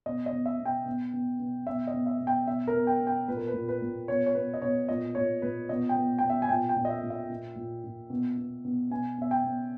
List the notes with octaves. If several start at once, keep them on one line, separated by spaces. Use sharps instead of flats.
B2 D#5
D#5
B2
E5
B2
G5
B2
B2
B2
B2 E5
D#5
B2
E5
B2
G5
B2 E5
A#4
B2
G5
B2
G5
A#2 B4
A#4
B4
A#2
B4
A#2
B2 C#5
C#5
B2 B4
D#5
B2 C#5
A#2 D#5
A#2 C#5
A#2 B4
B2 D#5
G5
B2
B2 G5
E5
G#5
A#2 G5
G5
A#2
D#5
E5
A#2
E5
A#2
A#2
A#2
B2
B2
B2
B2 G#5
B2 E5
G5
B2